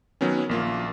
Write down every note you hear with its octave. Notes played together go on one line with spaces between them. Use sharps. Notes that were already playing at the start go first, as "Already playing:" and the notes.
D#3 F#3 B3 C#4
A#1 A#3 F4